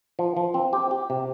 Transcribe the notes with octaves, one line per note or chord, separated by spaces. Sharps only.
F3
F3
C4
G4
G4
C3